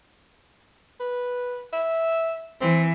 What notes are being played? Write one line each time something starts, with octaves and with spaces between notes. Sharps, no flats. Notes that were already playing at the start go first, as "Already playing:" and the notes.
B4
E5
E3 C4